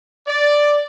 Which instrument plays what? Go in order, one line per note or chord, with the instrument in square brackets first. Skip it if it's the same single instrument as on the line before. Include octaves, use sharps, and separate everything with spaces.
[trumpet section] D5